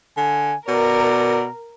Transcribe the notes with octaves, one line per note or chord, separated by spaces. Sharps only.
D3 G#5
B2 A#4 D5